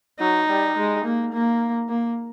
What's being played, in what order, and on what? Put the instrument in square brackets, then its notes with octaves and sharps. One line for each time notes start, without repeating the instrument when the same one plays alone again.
[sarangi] F#3 [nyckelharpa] D#4
[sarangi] G3
G#3
A#3
A#3
A#3